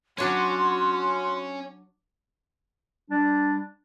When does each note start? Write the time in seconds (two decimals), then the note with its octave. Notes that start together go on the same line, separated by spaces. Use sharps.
0.18 F#3 C#4 D4 F#4 C#5 C6
3.10 G3 D4